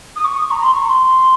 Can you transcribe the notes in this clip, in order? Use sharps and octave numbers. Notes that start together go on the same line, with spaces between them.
D#6
C#6
D#6
C#6
A#5
C6
C#6
A#5
C6